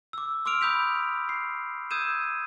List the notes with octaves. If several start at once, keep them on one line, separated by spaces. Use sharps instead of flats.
D6 E6
C6 D6 E6 F6 D7 F7
B5 D#6 G6 B6 F7
C7
D#6 E6 G6 G#6 D#7 E7